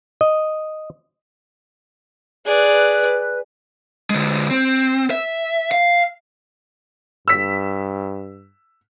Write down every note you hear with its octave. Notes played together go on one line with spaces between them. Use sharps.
D#5
G#4 B4 D5 F#6
D3 G#3
C4
E5
F5
G2 E6 B6